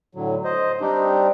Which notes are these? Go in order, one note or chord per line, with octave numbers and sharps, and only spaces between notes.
A2 D3 F#3
C5 D#5
G3 C4 D4 D#4 G4